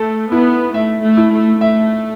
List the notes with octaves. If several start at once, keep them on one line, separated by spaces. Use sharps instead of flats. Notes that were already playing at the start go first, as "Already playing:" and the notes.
Already playing: A3 A4
B3 E4
A3 E5
A3
E4
A3
A3 E5